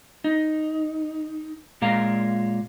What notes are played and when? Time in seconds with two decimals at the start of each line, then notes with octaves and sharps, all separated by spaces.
0.24 D#4
1.82 A#2 G#3 F5 A#5